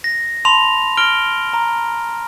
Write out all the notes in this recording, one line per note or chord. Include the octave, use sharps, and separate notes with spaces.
A#6
A5 B5 C6 F7
F6 A#6 D7 G7
A#5